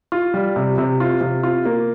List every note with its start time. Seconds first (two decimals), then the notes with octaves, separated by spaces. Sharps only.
0.12 F4
0.34 G3
0.56 C3
0.78 C3
1.00 F4
1.21 C3
1.43 F4
1.65 A#3